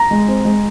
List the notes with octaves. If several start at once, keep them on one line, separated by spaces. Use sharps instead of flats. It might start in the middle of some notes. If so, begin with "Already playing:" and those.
Already playing: A#5
G#3
C4
G#3